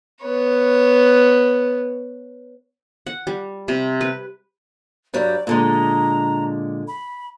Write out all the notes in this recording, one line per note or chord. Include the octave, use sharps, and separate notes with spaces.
B3 C#5
F#5
G3
C3
B4
G2 F#3 G3 D5
A#2 D3 G#3 A#5
B5